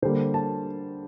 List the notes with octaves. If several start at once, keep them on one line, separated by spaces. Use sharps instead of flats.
D3 G3 A#3 C5
A5